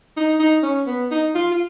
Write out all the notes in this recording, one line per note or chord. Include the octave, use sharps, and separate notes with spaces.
D#4
D#4
C#4
B3
D#4
F4
F4